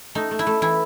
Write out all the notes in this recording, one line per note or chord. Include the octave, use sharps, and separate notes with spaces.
A3 D#4
A3
E4
A3
E3 E4